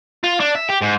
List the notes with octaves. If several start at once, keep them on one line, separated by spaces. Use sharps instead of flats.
F4
D4
E5
G4
G#2